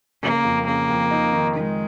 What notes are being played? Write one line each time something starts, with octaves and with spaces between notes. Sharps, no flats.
C#3 A#3
F2
C#3 A#3
F2
D#4
D#3
D#3 G#3